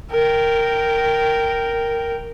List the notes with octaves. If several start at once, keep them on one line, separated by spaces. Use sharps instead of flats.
A#4 G5